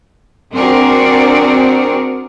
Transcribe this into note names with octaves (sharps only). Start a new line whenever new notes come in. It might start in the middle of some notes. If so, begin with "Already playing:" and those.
C4 D4 F#4 G#4 A#4 D5